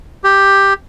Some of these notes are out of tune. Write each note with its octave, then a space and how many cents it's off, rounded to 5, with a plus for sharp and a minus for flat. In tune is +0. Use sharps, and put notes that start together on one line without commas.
G4 +5